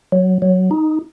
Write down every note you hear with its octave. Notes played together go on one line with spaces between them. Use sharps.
F#3
F#3
D#4